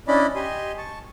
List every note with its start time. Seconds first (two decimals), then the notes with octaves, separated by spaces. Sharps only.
0.08 C#4 D4 E4 D5 D#5 B5
0.35 G4 D#5 G#5 C6
0.78 A5 C#6